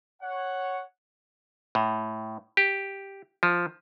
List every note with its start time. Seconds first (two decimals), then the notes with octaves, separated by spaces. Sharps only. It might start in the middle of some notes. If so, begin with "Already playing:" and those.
0.22 C#5 F#5
1.75 A2
2.57 G4
3.43 F3